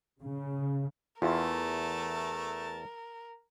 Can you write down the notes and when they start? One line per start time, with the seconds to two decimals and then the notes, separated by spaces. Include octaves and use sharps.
0.21 C#3
1.22 E2 A3 E4 F4 A#4 A5